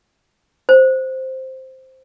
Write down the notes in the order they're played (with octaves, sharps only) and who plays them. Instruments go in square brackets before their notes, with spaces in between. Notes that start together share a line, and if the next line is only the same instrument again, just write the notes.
[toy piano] C5